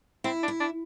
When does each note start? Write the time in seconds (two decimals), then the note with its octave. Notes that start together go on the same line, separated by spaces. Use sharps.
0.24 C4 E4
0.43 D4
0.48 E4
0.60 D4